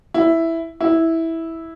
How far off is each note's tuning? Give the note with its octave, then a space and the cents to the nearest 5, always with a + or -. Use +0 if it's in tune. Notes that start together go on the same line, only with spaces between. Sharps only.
E4 +0
E4 -10